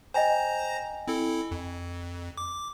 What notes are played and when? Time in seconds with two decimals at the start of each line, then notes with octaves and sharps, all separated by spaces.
0.14 C5 D#5 G5 G#5 A#5 A#6
1.07 C4 E4 A4
1.51 F2
2.38 D6